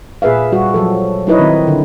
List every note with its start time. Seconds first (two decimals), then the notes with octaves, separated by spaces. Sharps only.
0.22 A#2 G#4 B4 E5 F5
0.52 G3 F#4
0.74 F3 F#3 A4
1.27 F#3 D#4 E4 B4 C#5 D#5
1.39 D#3 C4
1.67 D3